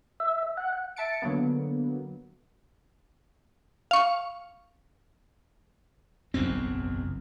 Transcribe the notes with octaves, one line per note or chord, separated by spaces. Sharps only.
E5
F#5
E5 A5 A6 C#7 D7
D3 F#3 A#3 B3
F5 C#6
F#1 B1 E2 C4